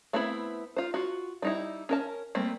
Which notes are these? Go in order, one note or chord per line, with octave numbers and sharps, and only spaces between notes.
A3 B3 C4 E4 B5
F4 C5
F4 F#4
G3 D#4 E4
C#4 A#4 A5
G3 A3 A#3 C4